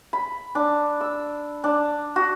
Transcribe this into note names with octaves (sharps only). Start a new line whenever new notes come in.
B5
D4
E6
D4
F#4